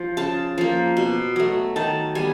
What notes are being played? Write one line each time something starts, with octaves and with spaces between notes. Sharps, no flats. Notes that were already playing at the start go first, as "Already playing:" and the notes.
Already playing: F3
C#3 A5
F3 A#3
B2
F#3 A3
D#3 A5
G3 B3 G#5